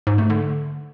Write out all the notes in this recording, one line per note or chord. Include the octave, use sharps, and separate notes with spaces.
G#2
A3
D3